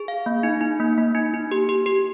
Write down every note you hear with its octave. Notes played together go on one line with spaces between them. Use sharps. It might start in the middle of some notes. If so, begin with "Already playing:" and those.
Already playing: G#4
F5
A#3
D#4
D#4
A#3
A#3
D#4
D#4
G4
G4
G4